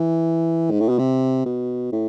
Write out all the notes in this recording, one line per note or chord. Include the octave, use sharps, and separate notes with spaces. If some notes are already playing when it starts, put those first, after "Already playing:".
Already playing: E3
G#2
A2
B2
C3
B2
A2